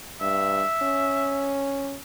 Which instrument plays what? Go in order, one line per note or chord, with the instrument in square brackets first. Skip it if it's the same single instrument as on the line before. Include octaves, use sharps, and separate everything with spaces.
[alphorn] G2 [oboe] E5
[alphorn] C#4